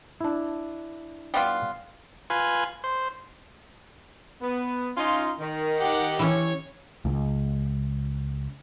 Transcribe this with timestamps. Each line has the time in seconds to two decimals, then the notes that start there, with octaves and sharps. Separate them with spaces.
0.21 D4 E4
1.34 G3 B3 F4
2.30 F4 B4 G#5
2.84 C5
4.41 B3
4.97 C#4 D#4 F4
5.40 D#3
5.78 G4 F#5
6.19 E3 C#4 C#5
7.05 C#2